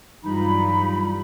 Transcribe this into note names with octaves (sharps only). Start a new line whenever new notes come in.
G2 E3 F#3 G3 D#4 F4 B5